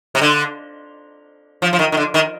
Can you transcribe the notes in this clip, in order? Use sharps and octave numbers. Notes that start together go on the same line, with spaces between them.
C3
D3
F3
F3
D#3
D#3
D3
D#3